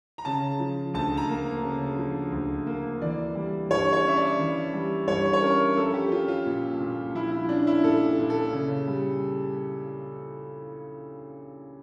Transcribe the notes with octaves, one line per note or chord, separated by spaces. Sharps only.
A#5
C#3 A5
F3
D2 A5
A#5
A#3
C#3
F3
D2
A#3
E3 D5
G3
G2 C#5
C#5
C#4 E5
D5
E3
G3
G2 C#5
C#5
C#4 A#4
F3 A4
G4
C#4 F4
F4
A#2
A#2
F3 E4
E4
C#4 D4
E4
A#2 A4
A#2
A4
C#3
G3